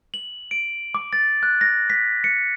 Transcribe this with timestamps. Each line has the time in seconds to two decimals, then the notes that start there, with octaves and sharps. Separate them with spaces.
0.14 F#7
0.51 D7
0.95 D6
1.13 A6
1.43 F#6
1.61 A#6
1.90 B6
2.24 C#7